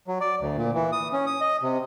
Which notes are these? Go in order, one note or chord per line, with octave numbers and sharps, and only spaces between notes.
F#3
D5
D2
A#2
E3
D#6
C#4
D#6
D#5
C3